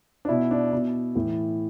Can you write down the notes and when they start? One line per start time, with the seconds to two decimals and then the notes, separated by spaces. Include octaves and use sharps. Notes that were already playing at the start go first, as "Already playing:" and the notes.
0.25 D4
0.29 B2 E4
0.51 D4
0.73 B2 E4
1.15 A2 E3